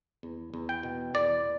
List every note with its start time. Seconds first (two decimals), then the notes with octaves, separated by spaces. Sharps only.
0.23 E2
0.54 E2
0.69 G5
0.83 B2
1.14 E2 D5